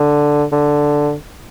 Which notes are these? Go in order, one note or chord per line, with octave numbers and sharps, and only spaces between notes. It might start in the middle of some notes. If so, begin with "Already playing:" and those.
Already playing: D3
D3